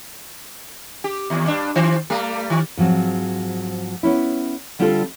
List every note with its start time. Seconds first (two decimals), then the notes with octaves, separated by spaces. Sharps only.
1.04 G4
1.30 D#2
1.47 G2 D4
1.75 D#3 C5
2.10 G3 A3
2.50 D#3
2.77 G#2 F3 F#3 C4
4.03 B3 C#4 E4
4.79 D3 G3 C4 D4 F4 A4